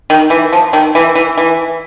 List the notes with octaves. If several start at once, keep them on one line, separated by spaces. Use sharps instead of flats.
D#3
E3
F3
D#3
E3
E3
E3